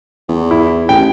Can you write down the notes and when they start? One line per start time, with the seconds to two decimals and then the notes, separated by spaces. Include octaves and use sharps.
0.29 E2
0.51 E4
0.89 A1 G5